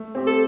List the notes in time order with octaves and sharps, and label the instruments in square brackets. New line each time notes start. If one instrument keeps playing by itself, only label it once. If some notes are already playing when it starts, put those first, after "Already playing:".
Already playing: [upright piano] A3
C4 G4
[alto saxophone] A4